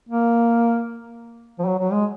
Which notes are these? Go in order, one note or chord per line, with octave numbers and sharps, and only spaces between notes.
A#3
F3
F#3
F#3
G#3